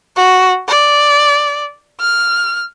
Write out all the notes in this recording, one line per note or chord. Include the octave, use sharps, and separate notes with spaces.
F#4
D5
F6